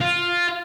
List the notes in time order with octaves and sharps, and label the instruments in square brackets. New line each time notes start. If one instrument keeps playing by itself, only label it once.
[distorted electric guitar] F4